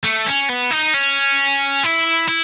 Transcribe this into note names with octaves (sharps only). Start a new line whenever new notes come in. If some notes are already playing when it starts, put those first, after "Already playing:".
A3
C#4
B3
D#4
C#4
E4
E4